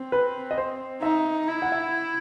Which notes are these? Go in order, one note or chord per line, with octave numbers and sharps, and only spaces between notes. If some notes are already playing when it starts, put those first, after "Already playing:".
Already playing: C4
B4
D#5
C5
D#4 E5
E4
F#5
E5